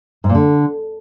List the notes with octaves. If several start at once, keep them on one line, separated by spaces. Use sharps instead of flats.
G#2
A#2
D3